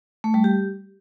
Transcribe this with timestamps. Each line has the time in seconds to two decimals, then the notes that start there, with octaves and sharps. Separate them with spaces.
0.24 A3
0.34 G3
0.44 G4